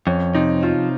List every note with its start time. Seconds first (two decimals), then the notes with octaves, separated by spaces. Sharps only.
0.07 F2 C#4
0.35 C3 D#4
0.63 F3 F4